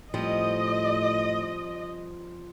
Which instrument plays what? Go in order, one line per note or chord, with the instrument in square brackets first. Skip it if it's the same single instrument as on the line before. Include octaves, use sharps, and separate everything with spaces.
[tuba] A2 [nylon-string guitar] F3 G3 C4 [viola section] D#5